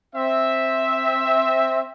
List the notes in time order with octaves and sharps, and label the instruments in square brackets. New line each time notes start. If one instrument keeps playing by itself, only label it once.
[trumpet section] C4 E5